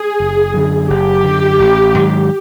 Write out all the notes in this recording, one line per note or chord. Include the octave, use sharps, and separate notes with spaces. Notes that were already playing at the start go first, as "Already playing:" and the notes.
Already playing: G#4
F#1
F#2 D3
F#1 G4
F#2 D3
A1
G#2 D#3 F#3